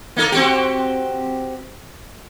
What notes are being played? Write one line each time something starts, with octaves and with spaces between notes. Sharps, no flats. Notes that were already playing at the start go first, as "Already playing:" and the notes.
A#3 D#4 A4
C4 F#4 G4